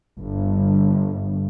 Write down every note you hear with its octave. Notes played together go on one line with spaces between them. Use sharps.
G1